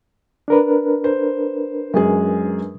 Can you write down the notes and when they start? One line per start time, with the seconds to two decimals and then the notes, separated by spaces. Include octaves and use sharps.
0.48 D4 A#4 B4
1.04 C5
1.94 F#2 G#3 G#4